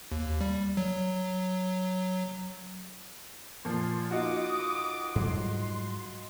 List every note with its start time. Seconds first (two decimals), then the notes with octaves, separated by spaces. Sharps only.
0.12 D#2
0.41 G3
0.77 F#3
3.65 A#2 F3 C6
4.11 D#4 F4 F#4 D6 D#6
5.15 G#2 F#3 G3 C6